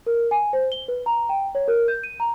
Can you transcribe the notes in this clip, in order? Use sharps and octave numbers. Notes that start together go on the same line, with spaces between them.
A#4
G#5
C5
G7
B4
A#5
G5
C#5
A#4
G6
D#7
A#5